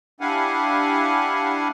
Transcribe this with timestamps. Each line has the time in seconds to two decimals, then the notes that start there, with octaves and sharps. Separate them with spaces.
0.20 D4 E4 G4 F5 F#5 G#5